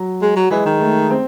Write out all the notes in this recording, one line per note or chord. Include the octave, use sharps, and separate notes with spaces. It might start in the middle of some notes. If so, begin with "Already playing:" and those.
Already playing: F#3
G#3
F#3
E3 G#3
D#3
A3
C4